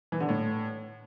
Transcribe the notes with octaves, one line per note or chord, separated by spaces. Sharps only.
E3
D3
A2